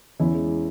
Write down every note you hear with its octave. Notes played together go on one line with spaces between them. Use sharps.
E2 C#4 E4
G#3